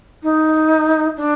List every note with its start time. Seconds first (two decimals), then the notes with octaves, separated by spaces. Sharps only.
0.23 D#4
1.16 D4